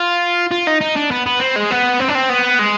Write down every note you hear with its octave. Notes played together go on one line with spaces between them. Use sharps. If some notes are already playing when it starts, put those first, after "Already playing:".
Already playing: F4
F4
D#4
D#4
D4
B3
B3
C4
G#3
B3
C4
D4
C4
B3
G#3